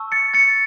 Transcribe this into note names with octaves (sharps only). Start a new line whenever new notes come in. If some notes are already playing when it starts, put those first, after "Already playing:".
Already playing: A5 C#6 E6
A6 C#7
A6 C#7